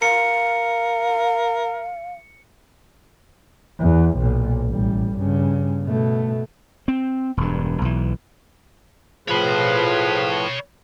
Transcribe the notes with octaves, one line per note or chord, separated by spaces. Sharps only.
A#4 F5 C#7
E2
B1 A#2
A1 G3
G2 C#3
B2 A3
C4
E1 G2
B1 E3
A2 F3 F4 G#4 B4 C#5 B5